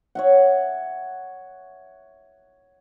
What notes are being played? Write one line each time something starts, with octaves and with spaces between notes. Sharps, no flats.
C#5 E5 F#5